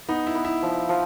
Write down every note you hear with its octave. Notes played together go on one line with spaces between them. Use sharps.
B3 D#4
E4
B3
E4
F3
F3